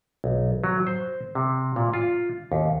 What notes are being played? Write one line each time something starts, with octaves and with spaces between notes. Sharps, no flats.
B1
F#3
C5
C3
A#2
F4
D#2